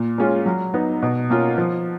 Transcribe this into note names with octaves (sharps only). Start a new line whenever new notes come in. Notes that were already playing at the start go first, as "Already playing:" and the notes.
Already playing: A#2
G#3 C#4 F4
F#3
B3 D#4
B2
A#3 C#4 F4
F3